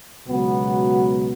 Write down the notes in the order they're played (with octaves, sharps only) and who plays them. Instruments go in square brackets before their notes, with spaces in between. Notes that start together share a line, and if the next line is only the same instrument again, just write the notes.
[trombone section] C#2 B2 F#3 B3